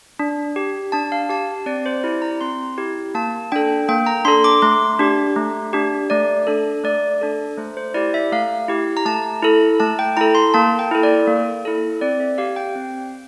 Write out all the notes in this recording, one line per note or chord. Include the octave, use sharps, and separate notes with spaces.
D4
G4
D4 A5
F5
G4 A5
C4 D5
C5
E4 G4 D5
A#5
C4 C6
E4 G4
A#3 A5
D4 A4 G5
A#3 G5
A#5
D4 A4 C6
D6
A3 C6
D4 G4
A3
D4 G4
A3 D5
D4 A4
A3 D5
D4 A4
A3 C5
C5
E4 G4 D5
E5
A3 F5
E4 G4
A#5
A3 A5
E4 A4
A3 A5
G5
E4 A4 A#5
C6
A#3 A5
G5
E4 A4
D5
A#3
E4 A4
C4 D5
E5
G4 F5
G5
C4